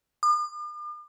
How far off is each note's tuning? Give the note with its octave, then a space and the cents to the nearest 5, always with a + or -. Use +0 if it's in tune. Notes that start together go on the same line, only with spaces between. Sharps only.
D6 +45